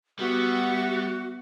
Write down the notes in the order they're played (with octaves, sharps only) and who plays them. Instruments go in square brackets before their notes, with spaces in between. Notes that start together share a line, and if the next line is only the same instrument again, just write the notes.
[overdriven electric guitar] G3 [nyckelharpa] B3 E5 [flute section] F#4